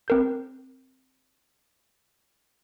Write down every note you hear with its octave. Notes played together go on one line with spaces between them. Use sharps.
C4 A#4 G6